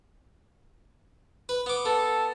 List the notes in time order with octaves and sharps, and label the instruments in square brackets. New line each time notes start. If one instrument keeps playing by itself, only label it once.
[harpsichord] B4
B3 D6
[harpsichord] B3 [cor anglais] A4